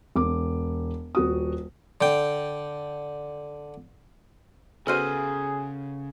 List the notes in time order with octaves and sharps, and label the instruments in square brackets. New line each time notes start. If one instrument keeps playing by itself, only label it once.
[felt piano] E1 D6
D#1 F#4 D#6
[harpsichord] D3 G5
[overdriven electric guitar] C#3 [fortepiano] B3 F#4 C5 [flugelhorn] G#4 [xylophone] A4 F6 D#7